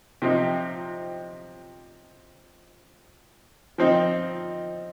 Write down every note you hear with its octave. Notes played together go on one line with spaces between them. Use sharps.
C3 F3 C4 D#4
F3 C4 D#4